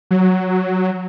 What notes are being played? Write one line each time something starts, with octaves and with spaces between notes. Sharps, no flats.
F#3